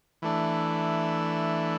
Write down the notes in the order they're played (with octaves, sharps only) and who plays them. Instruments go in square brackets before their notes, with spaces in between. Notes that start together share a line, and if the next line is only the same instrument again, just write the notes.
[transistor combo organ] E3 A3 D4